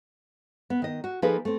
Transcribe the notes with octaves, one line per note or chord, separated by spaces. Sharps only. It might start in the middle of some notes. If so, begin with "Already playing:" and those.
B3
D#3 D#5
F#4
F3 A#3 D#4 G#4 A4 B4
A3 C4